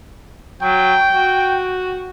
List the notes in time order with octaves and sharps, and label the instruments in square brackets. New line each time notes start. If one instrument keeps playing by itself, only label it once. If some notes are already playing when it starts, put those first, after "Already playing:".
[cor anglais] F#3 [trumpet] G5
[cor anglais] F#4